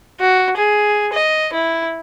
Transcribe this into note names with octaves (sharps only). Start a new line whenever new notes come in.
F#4
G#4
D#5
E4